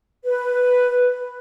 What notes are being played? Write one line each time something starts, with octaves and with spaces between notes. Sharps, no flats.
B4